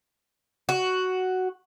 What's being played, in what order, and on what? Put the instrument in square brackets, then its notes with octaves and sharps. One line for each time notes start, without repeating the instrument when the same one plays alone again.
[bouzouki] F#4